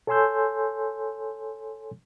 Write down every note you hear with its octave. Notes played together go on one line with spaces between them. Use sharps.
A4 C#5 G#5 C6 E6 G6